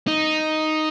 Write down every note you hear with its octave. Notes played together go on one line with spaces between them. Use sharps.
D#4